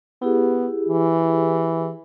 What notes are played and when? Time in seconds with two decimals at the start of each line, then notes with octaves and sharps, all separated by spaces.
0.22 B3 E4 G4 G#4
0.89 E3